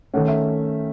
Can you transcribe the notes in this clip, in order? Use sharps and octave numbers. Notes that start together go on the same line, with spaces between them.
D#3 A3 C#4 F#5
E5